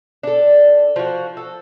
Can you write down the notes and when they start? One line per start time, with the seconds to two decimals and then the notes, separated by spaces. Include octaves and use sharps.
0.23 D4 A4
0.96 F3 F#4
1.37 A4